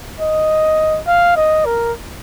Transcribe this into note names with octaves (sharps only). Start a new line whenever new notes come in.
D#5
F5
D#5
A#4